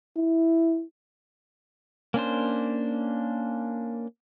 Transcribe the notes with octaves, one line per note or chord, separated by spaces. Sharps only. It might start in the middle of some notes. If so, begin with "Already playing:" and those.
E4
A#3 C#4 D4 C5